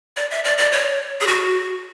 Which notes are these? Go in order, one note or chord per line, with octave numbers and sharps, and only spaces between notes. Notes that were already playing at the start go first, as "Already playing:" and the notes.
D5
E5
D5
D5
C#5
G#4
F#4